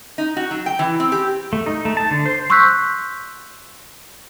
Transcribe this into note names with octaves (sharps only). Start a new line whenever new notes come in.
D#4
F#4
F#3
G5
E3
C4
G4
A3
D#4
A3
A5
D3
C5
C6 C#6 E6 F#6 G6 B6